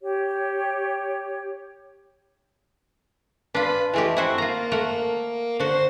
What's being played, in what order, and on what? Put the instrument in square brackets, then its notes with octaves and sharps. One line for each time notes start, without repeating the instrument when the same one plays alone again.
[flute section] G4 C#5
[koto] D4 F4 [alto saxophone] B4
[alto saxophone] E3 [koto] G#3 A3 G4
[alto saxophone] C4 [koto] E4 F#4 C5
[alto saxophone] A#3 [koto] F4 A#5
[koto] A3 A#4 F#5
[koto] D3 F#4 [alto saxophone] C5